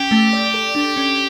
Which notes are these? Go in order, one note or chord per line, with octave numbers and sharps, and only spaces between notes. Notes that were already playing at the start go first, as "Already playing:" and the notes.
Already playing: C#4 G4
A3
D5
A4
D4
C#4